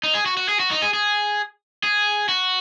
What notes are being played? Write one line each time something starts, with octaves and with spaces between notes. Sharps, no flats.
D#4
G#4
F#4
F#4
G#4
F#4
D#4
G#4
G#4
G#4
F#4